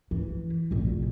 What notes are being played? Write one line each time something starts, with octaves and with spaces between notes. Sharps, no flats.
E3
F1 A#1